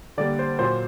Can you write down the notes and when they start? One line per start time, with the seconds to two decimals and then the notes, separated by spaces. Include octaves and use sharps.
0.17 D3 G3 A#3 D5
0.39 C5
0.59 A#2 F#3 A#3 C5